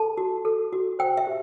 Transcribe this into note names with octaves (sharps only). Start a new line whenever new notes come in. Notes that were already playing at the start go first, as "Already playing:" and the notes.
Already playing: A4 A5
F#4
A4
F#4
C5 G5
E5
G4